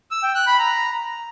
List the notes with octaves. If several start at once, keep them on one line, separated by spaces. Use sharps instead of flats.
E6
G5
F#6
B5
A#5